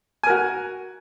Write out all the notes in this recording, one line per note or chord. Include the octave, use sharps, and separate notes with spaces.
F#4 A#4 G#5